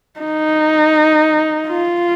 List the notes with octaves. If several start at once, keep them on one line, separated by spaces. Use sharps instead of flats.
D#4
F4